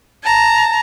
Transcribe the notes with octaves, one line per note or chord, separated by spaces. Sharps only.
A5 A#5